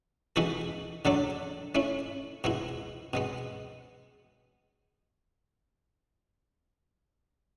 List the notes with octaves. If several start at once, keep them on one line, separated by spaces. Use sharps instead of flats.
E3 G#3 B3 F#4 A4
D3 F#3 A3 D4 A4
A3 C#4 E4
B2 G#3 B3 E4
B2 G#3 B3